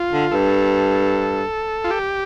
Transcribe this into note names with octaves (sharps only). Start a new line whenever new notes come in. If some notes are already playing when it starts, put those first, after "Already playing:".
Already playing: F4
D3
G2 A4
F4
G4